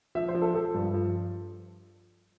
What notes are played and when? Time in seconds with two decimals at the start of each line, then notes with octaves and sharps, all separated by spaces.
0.15 F3 E5
0.28 C5
0.35 F3
0.42 A4
0.54 F3 A4
0.74 G2
0.94 F3